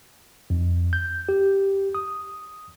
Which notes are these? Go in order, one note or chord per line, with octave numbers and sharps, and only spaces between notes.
F2
G6
G4
D#6